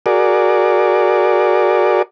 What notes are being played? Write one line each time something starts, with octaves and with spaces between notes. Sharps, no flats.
F#4 G#4 A#4 D5